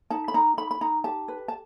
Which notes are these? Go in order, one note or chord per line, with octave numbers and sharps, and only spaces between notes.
D#4 A5
B5
D#4 A#5
D#4 B5
B5
D#4 A#5
G4 A5
B4
A5